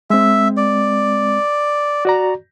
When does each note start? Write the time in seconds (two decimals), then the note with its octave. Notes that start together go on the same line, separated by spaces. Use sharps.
0.10 G#3 C4 E5
0.57 D5
2.05 F#4 D5 A#5